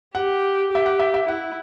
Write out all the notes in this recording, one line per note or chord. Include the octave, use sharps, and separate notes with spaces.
G4 F#5
G4 E5
F#5
E5
E5
E4 F#5